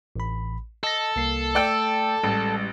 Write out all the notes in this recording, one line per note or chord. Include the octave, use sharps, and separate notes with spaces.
A1 B5
A4 D#5 A#6
C2 A#3 C7
A3 D5 G5 E6
A1 G3 G#3 G4